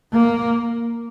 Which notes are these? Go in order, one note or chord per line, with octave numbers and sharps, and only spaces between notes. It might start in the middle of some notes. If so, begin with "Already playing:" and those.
A#3